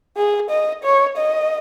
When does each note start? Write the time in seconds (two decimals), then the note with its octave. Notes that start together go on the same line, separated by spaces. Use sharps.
0.17 G#4
0.50 D#5
0.84 C#5
1.17 D#5